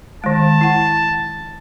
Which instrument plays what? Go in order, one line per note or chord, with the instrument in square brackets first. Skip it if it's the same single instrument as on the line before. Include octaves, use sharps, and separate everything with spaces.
[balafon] D#3 G#3 [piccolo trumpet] A5
[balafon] E4 F#5